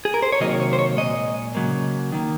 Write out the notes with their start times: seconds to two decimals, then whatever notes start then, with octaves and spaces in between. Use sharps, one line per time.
0.05 G#4
0.14 A#4
0.23 C5
0.32 C#5
0.40 C3 D#3 F#3 A#3 D#5
0.60 C#5
0.73 C5
0.79 C#5
0.97 A#2 G#3 D#5
1.55 C#3 F#3 A#3
2.12 D#3 A#3